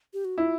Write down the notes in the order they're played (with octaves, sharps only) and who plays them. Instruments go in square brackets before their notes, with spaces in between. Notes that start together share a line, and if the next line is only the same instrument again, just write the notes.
[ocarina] G4
F#4
[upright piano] E4 [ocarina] F4